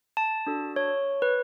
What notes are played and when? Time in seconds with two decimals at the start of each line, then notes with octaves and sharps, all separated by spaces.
0.17 A5
0.47 D4 F#4 A4
0.76 C#5
1.22 B4